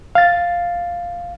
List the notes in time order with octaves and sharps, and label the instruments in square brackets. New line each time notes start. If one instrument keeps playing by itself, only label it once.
[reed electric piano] F5 A6